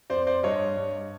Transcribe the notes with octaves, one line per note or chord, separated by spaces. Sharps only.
F2 C5 D5
C5 D5
G2 C#5 D#5
G2